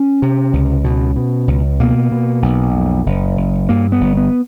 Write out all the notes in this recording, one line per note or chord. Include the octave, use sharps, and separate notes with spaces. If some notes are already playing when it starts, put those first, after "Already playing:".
Already playing: C#4
C3
C#2
B2
B2
C#2
B2 A#3
B2
B1
F2
F#1
F#1
G2 A#3
B3
G1
B3